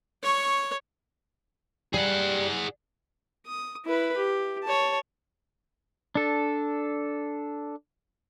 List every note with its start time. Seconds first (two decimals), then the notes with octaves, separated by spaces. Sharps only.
0.22 C#5 C#6
1.94 G3 G#4 F#5
3.46 D#6
3.85 E4 B4
4.17 G4
4.63 C#5 A5
6.15 D4 A4